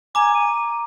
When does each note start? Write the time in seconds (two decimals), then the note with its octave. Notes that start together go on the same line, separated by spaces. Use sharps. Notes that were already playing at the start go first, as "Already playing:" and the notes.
0.15 G#5 A#5 D6
0.34 D#7